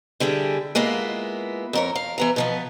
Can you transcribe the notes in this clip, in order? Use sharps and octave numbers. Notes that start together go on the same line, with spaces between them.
D3 G3 E4 G#4
G#3 A#3 B3 E4 F4
F2 A#4 C#5
F5
E3 B3 A#5
B2 F3 B3